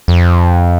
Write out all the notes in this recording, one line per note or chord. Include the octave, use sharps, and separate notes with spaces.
F2